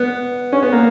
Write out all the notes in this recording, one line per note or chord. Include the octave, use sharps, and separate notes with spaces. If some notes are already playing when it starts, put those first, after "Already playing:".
Already playing: B3
C#4
B3
A#3